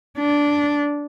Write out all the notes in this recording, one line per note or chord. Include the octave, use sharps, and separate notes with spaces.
D4